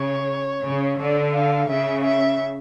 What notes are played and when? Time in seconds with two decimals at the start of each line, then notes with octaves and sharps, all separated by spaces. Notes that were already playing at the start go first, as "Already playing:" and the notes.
Already playing: C#3 C#5
0.67 C#3
1.01 D3 D5
1.35 F5
1.70 C#3 E5
2.04 E5